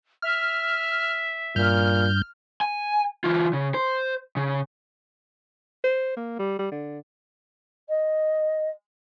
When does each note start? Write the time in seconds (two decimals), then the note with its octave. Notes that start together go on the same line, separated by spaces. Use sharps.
0.22 E5 F6
1.56 G2 A#2 F6 G6
2.61 G#5
3.24 E3 F4
3.53 C#3
3.74 C5
4.37 C#3
5.84 C5
6.17 A#3
6.39 G3
6.59 G3
6.72 D3
7.89 D#5